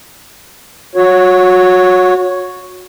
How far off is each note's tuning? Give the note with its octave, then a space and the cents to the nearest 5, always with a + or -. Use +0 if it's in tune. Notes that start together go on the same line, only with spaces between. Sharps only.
F#4 -25 C#5 +0